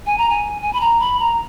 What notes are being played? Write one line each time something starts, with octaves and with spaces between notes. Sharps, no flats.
G#5
A#5
G#5
G#5
B5
A#5
B5
A#5